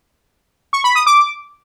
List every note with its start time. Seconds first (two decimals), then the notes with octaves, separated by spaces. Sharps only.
0.73 C#6
0.84 B5
0.95 D#6
1.07 D6